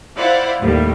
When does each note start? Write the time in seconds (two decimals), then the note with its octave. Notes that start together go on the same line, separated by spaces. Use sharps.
0.16 E4 C5 D5 F5 F#5
0.61 D#2 A2 G3